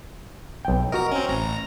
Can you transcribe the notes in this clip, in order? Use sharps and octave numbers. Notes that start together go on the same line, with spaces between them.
B1 G5
F#4 A#4 D#5 A#5
C4 C#4
A1 A#5